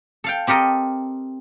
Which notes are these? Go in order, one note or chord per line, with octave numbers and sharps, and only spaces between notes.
A4 F5 G5
C4 G4 A4 A#4 D#5